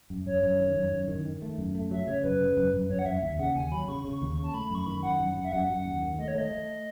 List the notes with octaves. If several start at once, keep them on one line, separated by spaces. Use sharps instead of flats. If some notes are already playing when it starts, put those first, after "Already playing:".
F#2
F#2 C#5
F#2 C#5
D#3
F#2
F#2
D#3
D#3
A3
F#2
A3
F#3 E5
C#3 C#5
F#2 B4
C#3
F#2
F#2
F#2 C#5
F#5
F#2 E5
D#2 E5
C#3 F#5
D#2 G#5
F#3 B5
C#3 C#6
C#3
D#2
C#3
A5
A3 B5
F#2 C#6
D#3 B5
F#2 F#5
F#2
F#2
E5
F#2 F#5
F#2
D#2
D#3
A3 D#5
C#5
A3 D#5
A3